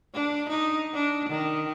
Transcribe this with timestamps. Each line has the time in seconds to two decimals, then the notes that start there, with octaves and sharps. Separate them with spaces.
0.14 D4
0.50 D#4
0.94 D4
1.29 D#3